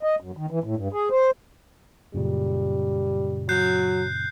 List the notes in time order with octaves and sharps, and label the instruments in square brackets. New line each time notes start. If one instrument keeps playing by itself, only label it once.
[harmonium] D#5
F#2
D#3
E3
A2
G2
G#4
C5
[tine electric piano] F#2 A#2 C#3 [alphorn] G3
[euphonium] F#3 [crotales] F#6 G6 C7